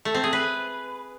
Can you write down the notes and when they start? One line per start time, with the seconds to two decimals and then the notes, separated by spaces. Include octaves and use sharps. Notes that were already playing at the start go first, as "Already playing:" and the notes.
0.05 A3
0.14 C4
0.24 G#4
0.33 B4